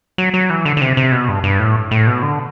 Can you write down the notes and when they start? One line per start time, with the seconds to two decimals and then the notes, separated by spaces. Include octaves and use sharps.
0.18 F#3
0.34 F#3
0.50 E3
0.65 D3
0.77 D3
0.81 C3
0.97 C3
1.12 B2
1.28 G2
1.44 G2
1.59 A2
1.91 A2
2.07 B2
2.22 D3